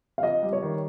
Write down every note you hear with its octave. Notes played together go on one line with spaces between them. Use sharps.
F5
F2 D#5
G3
C#5
D#3